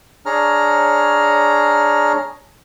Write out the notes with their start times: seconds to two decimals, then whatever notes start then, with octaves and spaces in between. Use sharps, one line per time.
0.26 D4 G#4 C#5 A#5 F6